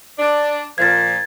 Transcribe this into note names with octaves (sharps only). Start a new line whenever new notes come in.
D4
A#2 F3 G#6 A6